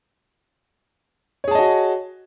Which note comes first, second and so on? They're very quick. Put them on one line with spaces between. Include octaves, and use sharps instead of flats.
C#5 G#4 A5 D#5 F#4